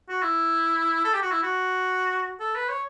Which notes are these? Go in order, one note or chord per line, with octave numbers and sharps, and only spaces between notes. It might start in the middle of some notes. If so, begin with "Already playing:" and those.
F#4
E4
A4
G4
F#4
E4
F#4
A4
B4
C#5